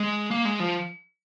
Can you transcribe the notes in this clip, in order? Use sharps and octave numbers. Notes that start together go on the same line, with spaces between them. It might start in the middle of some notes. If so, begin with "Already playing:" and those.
Already playing: G#3
A#3
G#3
F3